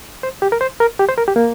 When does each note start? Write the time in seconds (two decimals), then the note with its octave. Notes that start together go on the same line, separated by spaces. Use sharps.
0.23 C5
0.42 G4
0.52 A#4
0.61 C5
0.80 A#4
0.99 G4
1.09 C5
1.18 A#4
1.28 G4
1.36 A#3